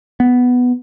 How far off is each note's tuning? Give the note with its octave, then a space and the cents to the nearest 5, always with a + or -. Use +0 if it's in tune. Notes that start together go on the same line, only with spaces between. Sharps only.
B3 +5